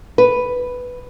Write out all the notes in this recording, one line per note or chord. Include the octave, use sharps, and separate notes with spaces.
B4